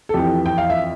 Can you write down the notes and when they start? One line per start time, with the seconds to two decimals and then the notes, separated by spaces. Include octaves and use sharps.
0.09 A4
0.14 F2 E3 G4
0.46 G5
0.58 F5
0.70 E5